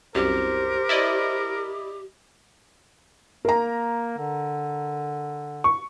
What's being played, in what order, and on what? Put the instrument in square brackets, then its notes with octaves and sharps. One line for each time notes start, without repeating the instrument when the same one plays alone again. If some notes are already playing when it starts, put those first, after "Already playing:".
[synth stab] C2 F#2 [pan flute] G4 [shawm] A#4 [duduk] C5
[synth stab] E4 D5 D#5
[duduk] A#3 [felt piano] A#4 A#5
[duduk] D3
[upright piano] C#6